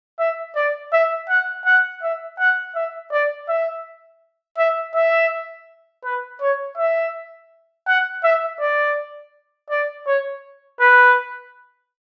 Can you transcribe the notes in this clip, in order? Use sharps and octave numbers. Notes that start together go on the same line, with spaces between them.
E5
D5
E5
F#5
F#5
E5
F#5
E5
D5
E5
E5
E5
B4
C#5
E5
F#5
E5
D5
D5
C#5
B4